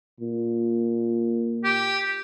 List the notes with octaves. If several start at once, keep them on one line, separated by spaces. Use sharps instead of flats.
A#2
G4